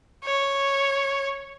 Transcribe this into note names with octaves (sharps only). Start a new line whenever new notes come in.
C#5